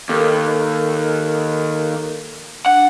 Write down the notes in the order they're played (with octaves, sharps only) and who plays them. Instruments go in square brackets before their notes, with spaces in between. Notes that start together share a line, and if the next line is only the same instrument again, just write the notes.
[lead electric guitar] D#2 [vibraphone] A4 A#4
[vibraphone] D4 [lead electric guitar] F#5